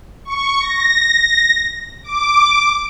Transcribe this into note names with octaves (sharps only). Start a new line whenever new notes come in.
C#6
A#6
D6